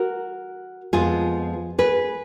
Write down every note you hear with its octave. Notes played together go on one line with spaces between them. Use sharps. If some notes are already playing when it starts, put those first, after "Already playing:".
Already playing: F#4 A#4
F2 F3 G#3 B3 F4 G#4
G#4 B4